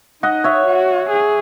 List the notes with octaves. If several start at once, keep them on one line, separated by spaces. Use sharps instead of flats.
D#4 D#5 F#5
C#5 E5
F#4
G#4